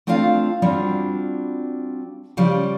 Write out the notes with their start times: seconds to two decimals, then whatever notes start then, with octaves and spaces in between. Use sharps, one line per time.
0.07 A3 C4 D4 F4 F5 A5
0.62 G3 C4 D4 F4 F#4
2.37 C#3 F3 G3 D5